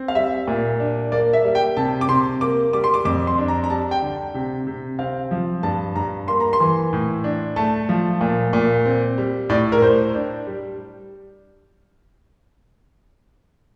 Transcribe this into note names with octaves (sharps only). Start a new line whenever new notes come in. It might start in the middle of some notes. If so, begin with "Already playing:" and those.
Already playing: C4
F5
G3 E5
A#2
D4
A#3 D5
E5
G3
G5
C3 A5
D6
C3 C6
A#3 D6
G3 D6
C6
D6
F2 D6
C6
D4
A#5
A#5
G3 A5
G5
D3
C3
C3
C4 F5
F3
G2 A5
G2 A#5
A#3 C6
A#5
C6
E3
A2
D4
A3 A5
F3
A#2
A#2
C4
G3
A2 D5
A#4
A2 C5
D4
G3